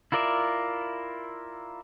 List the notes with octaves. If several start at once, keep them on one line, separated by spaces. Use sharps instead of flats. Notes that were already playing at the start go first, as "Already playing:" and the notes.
E4 F4 A#4 D5 E5